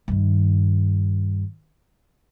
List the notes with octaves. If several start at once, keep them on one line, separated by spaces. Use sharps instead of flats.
G2 D#3